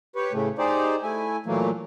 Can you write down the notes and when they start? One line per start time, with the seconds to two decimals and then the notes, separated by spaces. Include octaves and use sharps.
0.16 G4 B4 C#5
0.33 A2 C#3 A3
0.58 D#4 G4 G#4 C5 D5
1.02 A3 E4 G#5
1.46 A#2 E3 F#3 A3 A#3